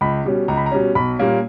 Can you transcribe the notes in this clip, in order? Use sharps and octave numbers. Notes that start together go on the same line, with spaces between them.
C#2 B5
B2 G3 C#4
C#2 A#5
B5
A#5
B2 G3 C#4
B1 B5
A#2 G3 A#3 C#4